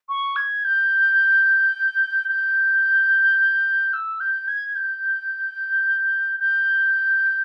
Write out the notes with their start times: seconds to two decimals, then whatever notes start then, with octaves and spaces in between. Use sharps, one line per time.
0.09 C#6
0.36 G#6
0.64 G6
2.29 G6
3.93 E6
4.20 G6
4.48 G#6
4.75 G6
6.40 G6